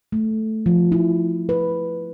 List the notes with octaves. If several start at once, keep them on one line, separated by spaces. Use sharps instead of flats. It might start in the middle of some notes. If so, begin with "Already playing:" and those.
A3
F3
E4
B4